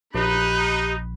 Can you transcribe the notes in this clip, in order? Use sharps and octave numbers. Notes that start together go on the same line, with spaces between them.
A#1 D#4 G4 B5 F#6